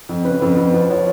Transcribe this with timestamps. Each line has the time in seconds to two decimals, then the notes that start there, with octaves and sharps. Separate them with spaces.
0.09 F2
0.25 C#3 B4
0.42 F2
0.57 F2
0.73 F3
0.89 F3 C#5